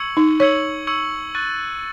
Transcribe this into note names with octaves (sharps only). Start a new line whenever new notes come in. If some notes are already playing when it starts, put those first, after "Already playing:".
Already playing: C#6 E6 G#6 C#7 F#7
D#4
C#5 C#6 E6 G#6 C#7 F#7
C#6 E6 G#6 C#7 F#7
C#6 F#6 A6 D#7